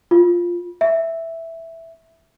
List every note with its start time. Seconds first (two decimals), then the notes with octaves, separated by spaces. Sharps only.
0.11 F4
0.81 E5